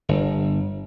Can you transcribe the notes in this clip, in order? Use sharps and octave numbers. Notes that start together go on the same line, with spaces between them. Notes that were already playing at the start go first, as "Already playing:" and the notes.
G1